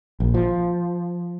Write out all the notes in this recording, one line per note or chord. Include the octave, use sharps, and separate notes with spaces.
A#1
F3